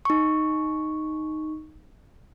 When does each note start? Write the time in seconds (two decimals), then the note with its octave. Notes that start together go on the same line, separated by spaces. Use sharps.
0.05 D#4 C#6